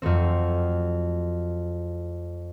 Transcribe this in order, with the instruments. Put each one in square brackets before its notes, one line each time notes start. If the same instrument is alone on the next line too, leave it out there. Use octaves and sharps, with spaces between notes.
[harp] F2 F#3 A3 C4